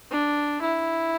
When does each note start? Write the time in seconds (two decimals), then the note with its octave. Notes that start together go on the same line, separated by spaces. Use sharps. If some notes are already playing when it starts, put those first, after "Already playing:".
0.12 D4
0.62 E4